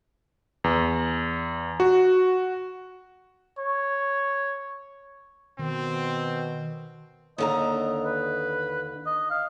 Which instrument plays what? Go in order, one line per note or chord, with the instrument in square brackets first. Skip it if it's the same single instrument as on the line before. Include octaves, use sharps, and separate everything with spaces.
[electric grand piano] E2
F#4
[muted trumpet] C#5
[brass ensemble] B2 [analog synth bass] D#3 [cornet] C4
[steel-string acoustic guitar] D#2 D3 A#5 [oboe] D#5
[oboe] B4
D#5
F5